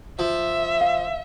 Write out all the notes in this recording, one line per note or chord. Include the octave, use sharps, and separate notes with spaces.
F3 E5
F5